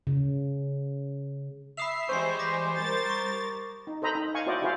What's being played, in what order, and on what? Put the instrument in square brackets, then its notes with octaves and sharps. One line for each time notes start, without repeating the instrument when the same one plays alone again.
[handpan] C#3
[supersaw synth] E5 C7 [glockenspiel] B5 D#6 F7
[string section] E3 G3 G#3 [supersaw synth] C5 [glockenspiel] C#6 C7
[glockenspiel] D6 A#6 B6
[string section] G3 A#4 A6
[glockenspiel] C#6
[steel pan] D#4
A4 C5 D#5 A#5 B5
D#4
F5 G#5 C#6
E4 F#4 C5 D5 D#5
E4 F#4 G#4 C5 D5 F5